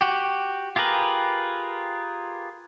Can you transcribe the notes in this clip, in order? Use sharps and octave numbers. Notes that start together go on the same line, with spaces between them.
F#4 G4
F4 G4 G#4 A#4 B4